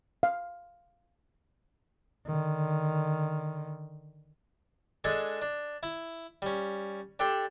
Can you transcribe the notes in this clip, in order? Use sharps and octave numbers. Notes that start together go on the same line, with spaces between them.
F5
D3 D#3
G#3 D4 G#4 A4
D4
E4
G3 C#4
D4 G4 A4 D5 G5 C6